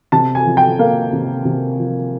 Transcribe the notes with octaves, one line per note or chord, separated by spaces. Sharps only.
C3 A5
G#5
F3
G5
A#3 F5
C3
C3
F3